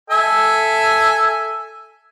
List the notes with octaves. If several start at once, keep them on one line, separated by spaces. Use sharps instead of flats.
A4 E5 G#5